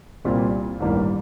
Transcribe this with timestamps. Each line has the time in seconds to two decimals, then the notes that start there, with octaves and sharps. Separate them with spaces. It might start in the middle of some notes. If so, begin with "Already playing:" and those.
0.25 C2 A#2 G3 C4 F4
0.80 A1 G2 D#3 G3 A#3